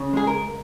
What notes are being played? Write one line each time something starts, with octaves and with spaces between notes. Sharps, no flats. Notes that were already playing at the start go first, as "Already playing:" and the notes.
Already playing: C#3
G#3 G#4
A#4
C#2